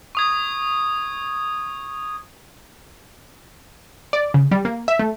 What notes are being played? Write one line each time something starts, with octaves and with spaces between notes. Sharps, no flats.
C#6 D#6 G#6
D5
C#3
G3
A#3
E5
A3